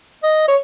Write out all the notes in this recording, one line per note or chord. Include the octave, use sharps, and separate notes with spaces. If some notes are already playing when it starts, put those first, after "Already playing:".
D#5
C#5